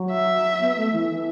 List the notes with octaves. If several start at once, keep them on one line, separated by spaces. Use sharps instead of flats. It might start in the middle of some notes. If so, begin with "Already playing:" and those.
Already playing: F#3
E5
B3
A3
E3
E3